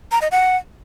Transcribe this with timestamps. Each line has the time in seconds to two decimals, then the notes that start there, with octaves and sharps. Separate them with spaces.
0.12 A#5
0.22 D#5
0.31 F#5